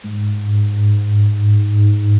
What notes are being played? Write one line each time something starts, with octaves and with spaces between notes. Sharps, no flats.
G#2